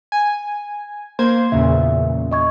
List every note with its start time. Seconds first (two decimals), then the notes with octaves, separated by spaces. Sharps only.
0.12 G#5
1.19 A#3 C5 C6 G#6
1.52 E2 A#2 C#3 E5
2.31 D#5 C#6 G#6